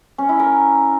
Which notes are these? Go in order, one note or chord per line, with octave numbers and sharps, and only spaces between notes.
C#4
E4
A#4